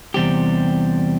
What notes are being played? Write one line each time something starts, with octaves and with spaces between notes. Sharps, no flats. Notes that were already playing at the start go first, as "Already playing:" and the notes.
E2 C3 G3 C4 G4